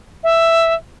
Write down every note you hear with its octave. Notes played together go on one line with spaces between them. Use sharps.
E5